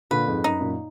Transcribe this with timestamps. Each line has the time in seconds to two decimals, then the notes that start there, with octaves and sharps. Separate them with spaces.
0.11 A#2 D3 B4
0.27 F2 G#2
0.44 F#2 D#4
0.60 F#2 A#2